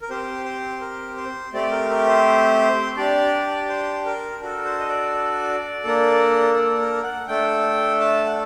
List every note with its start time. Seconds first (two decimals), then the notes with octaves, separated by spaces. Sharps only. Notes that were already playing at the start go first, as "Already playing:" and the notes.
0.02 A#4
0.10 C4 G4 C5
0.45 C5
0.81 A#4
1.17 C5
1.53 A3 C4 G4 D5
1.71 A#4
1.90 A#4
2.08 C5
2.97 D4 G4 D5
3.69 C5
4.05 A#4
4.41 D4 F#4 A4 A#4
4.65 C5
4.80 D#5
4.89 D5
5.84 A#3 D4 A4
6.56 D5
6.80 A#4
7.03 F#5
7.28 A3 D4 A4 G5
8.00 A5
8.26 F#5